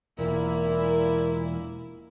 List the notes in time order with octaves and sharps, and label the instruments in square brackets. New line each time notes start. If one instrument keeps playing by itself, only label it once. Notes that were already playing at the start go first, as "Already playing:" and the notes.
[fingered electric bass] E1 [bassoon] A#2 [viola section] A#3 E4